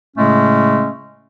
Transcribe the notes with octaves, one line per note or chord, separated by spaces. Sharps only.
A2 C#3 G#3 A3 C#4